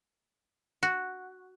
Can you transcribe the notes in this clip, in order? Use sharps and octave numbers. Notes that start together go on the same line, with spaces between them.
F#4